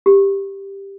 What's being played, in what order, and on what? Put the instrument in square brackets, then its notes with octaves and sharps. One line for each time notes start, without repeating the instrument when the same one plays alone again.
[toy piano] G4